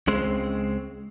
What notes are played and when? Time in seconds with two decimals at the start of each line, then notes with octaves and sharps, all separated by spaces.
0.07 C#2 C#3 G#3 C4